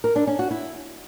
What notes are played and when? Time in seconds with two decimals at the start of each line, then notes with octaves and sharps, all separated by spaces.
0.04 A#4
0.16 D4
0.27 C#4
0.39 F#4
0.51 E4